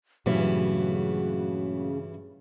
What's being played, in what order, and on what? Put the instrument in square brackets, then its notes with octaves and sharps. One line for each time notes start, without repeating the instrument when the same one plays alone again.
[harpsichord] G2 E3 [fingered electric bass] A#2 F#3 A3 [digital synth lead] C#3 [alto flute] F#4